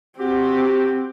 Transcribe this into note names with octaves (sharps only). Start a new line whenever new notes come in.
C4 F#4 G4